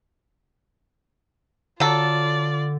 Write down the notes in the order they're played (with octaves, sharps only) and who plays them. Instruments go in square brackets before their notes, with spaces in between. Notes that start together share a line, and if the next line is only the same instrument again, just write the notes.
[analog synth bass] D3 [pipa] F#3 A4 [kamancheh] F4 D5